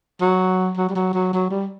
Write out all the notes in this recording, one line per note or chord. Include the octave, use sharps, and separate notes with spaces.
F#3
F#3
G3
F#3
F#3
F#3
G3